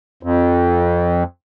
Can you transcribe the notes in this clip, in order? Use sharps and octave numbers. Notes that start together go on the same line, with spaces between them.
F2